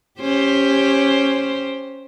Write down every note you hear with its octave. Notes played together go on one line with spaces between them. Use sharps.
C#4 G4 C5